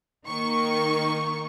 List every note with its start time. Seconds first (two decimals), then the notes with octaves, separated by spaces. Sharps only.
0.26 D#3 A#3 D#4 C#6